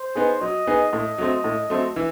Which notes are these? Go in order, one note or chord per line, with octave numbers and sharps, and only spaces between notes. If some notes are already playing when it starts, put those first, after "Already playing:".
Already playing: C5
B3 D#4 G#4
F#3 D#5
B3 D#4 G#4
A2 D#5
F#3 A3 C4
A2
F#3 A3 C4
E3